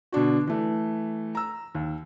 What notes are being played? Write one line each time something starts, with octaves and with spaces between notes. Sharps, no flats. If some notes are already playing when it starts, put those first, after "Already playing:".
B2 D3 D4 F#4
E3 A3
A#5 E6
D#2